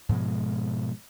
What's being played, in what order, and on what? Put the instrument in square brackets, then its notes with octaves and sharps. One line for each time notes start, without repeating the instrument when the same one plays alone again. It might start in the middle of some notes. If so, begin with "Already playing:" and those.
[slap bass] G#2 B2 F3 G#3